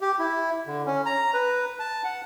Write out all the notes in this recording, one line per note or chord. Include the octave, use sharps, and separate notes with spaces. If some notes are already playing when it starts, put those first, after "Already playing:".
G4
E4
D3
C#4
A#5
B4
A5
F#5